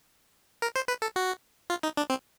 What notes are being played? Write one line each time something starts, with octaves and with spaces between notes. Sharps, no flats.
A#4
C5
B4
A4
F#4
F4
D#4
D4
C4